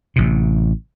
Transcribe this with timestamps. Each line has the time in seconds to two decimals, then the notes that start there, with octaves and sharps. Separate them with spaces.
0.16 A1 C3